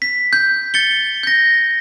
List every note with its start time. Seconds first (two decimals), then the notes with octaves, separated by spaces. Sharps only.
0.02 B6
0.33 G6
0.74 A6 C#7 G7
1.23 G6 A#6